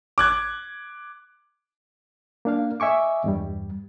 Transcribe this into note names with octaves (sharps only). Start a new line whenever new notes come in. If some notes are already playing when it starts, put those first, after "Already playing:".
D6 F#6 G#6
A#3 D4 F5
D#5 E5 G#5 C#6 D6
E2 G2 G3